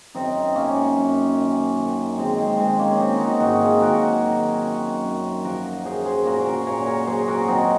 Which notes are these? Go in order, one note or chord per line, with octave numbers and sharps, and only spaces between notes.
F#2 C4 D#4
F#2 A#3 C#4
F#2
D#3
D#3
D#3 G#3 C4
G#3
D#3 G#3 C4
A#3 C#4
F#3 C4 D#4
D#4 F#4
G#2 D#4 F#4
F4 G#4
D#3 F#4 A#4
D#3
F#2
F#2
F3 F#4 A#4
F#2 G#4 C5
G#4 C5
A#2 F#4 A#4
F#4 A#4
A#2 A#4 C#5
A#4 C#5
F#3 G#4 C5
F#4 A#4
F#3 C4 D#4